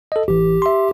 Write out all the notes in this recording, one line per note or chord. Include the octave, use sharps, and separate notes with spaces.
A4 D#5
A1 E3 G4
E5 C6